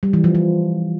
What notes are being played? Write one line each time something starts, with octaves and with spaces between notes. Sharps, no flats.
G3
E3
F3
F3